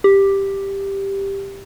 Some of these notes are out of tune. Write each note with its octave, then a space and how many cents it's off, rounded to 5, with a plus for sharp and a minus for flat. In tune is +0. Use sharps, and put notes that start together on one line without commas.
G4 +5